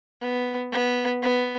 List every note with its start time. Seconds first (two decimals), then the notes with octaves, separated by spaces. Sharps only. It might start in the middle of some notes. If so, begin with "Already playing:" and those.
0.22 B3
0.72 B3
1.23 B3